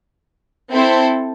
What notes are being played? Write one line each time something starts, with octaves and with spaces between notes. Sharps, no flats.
C4 E4 A4 C5